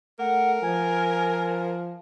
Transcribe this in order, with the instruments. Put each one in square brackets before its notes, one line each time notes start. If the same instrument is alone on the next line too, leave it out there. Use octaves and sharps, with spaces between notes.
[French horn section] A3 [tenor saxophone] A#4 [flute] F#5
[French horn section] F3 [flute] G#5